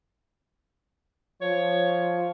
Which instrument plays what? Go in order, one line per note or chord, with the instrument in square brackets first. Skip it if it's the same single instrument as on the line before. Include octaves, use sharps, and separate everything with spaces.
[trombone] F3 [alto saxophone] C#5